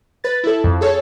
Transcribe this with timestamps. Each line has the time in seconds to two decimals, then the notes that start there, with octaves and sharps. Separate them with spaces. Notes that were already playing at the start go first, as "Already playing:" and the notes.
0.24 B4 A6
0.44 E4 A4
0.64 F2
0.81 G#4 A4 C#5